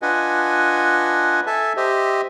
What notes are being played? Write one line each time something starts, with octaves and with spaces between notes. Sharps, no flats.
D4 F4 B4 D#5 F#5 G#5
A4 E5 G#5 A5
G4 C5 D#5 E5